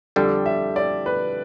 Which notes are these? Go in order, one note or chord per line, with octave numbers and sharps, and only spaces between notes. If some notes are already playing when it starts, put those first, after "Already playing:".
F2 D3 G3 D4 A4 G5
E5
D5
B4